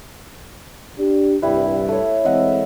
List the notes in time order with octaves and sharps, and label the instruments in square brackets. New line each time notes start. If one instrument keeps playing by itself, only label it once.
[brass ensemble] D4 G4
[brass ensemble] C2 G2 [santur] G3 E4 B4
[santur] A3 C#5
[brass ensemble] E3 G#3 C4 [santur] D#5 E5 F#5